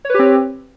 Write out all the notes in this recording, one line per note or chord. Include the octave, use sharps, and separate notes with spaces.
C4 G4 B4 C#5